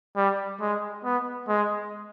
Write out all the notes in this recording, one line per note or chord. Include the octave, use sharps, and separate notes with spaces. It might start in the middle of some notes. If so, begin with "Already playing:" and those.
G3
G#3
B3
G#3